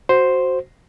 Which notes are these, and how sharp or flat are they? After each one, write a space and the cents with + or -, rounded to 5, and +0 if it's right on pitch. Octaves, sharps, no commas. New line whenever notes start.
F#4 +0 C5 +0